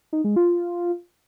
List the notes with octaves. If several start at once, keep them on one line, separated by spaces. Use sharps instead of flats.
D#4
G#3
F4